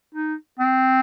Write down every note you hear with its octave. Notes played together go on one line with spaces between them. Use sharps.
D#4
C4